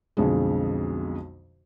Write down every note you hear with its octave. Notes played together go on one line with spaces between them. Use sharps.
B1 F2 D3 G#3